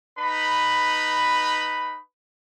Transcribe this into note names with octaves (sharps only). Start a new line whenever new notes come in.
D#4 B4 B5